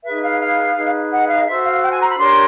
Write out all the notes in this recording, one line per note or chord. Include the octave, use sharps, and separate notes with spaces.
D#4 G#4 B4 E5
F5
F5
D#4 G#4 B4
F#5
F5
F#4 A4 C5 E5
F5
G5
G#5
A#5
B5
D4 G4 A#4 C#5 C6